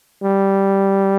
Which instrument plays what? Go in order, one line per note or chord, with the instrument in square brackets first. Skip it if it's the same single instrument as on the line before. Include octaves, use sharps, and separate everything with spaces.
[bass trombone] G3